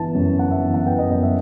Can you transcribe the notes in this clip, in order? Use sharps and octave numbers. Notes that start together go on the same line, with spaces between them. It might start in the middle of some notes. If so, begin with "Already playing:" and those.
Already playing: G1 E3 B3 A5
F#2
G1 F#5
E5
E3
F#5
B3 G5
D#5
F#2 D#5
E5